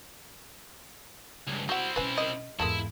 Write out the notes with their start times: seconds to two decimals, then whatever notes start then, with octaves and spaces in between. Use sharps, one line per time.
1.47 C#2 G2
1.69 C4 E4 F#4 F#5
1.96 B2 C#4 B4 G#5
2.18 A#4 D#5
2.60 E2 G#2 G#3 A#3 E4 A4